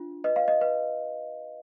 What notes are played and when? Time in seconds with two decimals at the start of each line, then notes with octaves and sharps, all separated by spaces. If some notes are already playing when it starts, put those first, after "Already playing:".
Already playing: D4 F4
0.24 B4 D#5
0.36 F5
0.48 D#5
0.61 B4